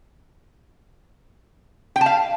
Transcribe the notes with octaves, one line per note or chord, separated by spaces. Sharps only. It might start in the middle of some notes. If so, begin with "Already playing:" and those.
G5
A5
F5